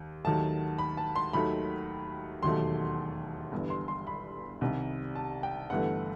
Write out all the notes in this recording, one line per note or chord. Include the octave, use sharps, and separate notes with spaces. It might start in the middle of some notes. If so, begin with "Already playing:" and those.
Already playing: D#2
D#2 D#3 F#3 A3 A5
B5
A5
C6
D#2 D#3 F#3 A3 B5
E1 D#2 D#3 F#3 A3 C6
G1 G2 E3
C6
C6
B5
C2 C3 D#3 G3
A5
G5
G1 G2 E3 A3 F#5